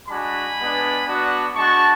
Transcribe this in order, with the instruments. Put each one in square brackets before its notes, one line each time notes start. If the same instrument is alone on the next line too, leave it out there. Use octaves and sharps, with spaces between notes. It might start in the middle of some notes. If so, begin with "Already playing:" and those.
[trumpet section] G#3 D4 F#4 G#5 B5
G#3 B3 D4
B3 D4 F#4
G#3 D4 F#4 A5 C#6